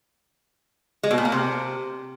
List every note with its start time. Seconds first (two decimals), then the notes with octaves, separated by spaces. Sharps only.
1.03 G#3
1.11 B2
1.18 A#2
1.25 A#3
1.32 C3